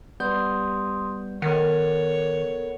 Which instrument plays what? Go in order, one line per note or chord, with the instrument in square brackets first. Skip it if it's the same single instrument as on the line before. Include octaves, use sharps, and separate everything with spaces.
[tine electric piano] G3 B3 G6 [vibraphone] G4 C6 D#6
[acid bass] D#3 [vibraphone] B3 A4 A#4 [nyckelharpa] C#5 [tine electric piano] F#5